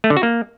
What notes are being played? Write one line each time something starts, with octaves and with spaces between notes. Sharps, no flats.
A3
D3
F#4
A#3